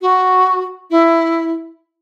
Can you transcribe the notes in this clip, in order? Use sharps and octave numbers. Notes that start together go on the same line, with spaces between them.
F#4
E4